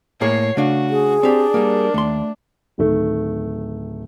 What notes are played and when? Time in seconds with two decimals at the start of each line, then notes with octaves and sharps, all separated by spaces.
0.21 A2 A#3 G#4 C#5 C7
0.57 C#3 A3 D4 F#4 F5
0.90 G#4
1.23 C4 D4 G4 D5
1.54 G3 A#3 A#4
1.94 D#2 A3 C6
2.78 D1 D#3 A3